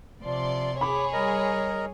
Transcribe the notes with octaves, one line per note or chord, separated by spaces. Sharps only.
C3 F3 D5 C6
G#4 C#5 B5 D6
G3 A#4 D#5 A#5